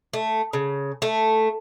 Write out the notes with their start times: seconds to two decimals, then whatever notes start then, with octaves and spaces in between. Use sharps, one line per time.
0.13 A3
0.53 C#3
1.02 A3